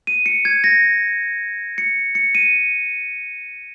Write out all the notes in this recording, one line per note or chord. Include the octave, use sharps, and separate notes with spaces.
D#7
C#7
G#6
A#6
C#7
C#7
D#7